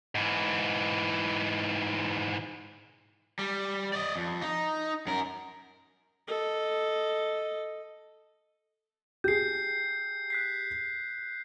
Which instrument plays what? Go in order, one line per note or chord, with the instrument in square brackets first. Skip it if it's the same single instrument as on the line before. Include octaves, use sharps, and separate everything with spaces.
[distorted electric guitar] G#2 E3
[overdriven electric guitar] G3
D5 D#5
F2
D#4
F#2 A#4
[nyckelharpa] A4 D#5
[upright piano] G4 G#4 [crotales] G6 C7
[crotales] F#6 B6 C7